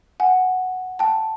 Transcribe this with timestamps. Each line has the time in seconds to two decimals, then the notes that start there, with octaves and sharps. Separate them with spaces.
0.20 F#5 G#5
0.99 G5 A5